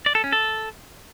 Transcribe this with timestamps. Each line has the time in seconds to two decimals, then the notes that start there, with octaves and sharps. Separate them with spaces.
0.06 D5
0.15 A4
0.24 C#4
0.32 A4